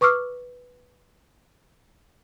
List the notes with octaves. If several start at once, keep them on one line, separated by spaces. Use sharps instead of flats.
B4 C#6 D6 E6 F6